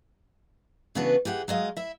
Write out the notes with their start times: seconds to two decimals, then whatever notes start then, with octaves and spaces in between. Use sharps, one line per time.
0.95 C#3 E3 B3 D4 F#4 B4
1.25 E3 G4 G#4 F#5
1.48 F#3 G#3 D#5 F5
1.77 E4 E5